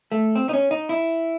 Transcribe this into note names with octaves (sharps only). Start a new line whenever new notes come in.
A3
C4
D#4
C#4
D#4
E4